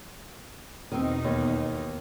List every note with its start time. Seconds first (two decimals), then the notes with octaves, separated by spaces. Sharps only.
0.92 E2 B2 D#3 C4 D#4
1.24 D#2